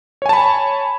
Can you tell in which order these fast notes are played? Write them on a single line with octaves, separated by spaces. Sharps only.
C#5 G#5 A5 B5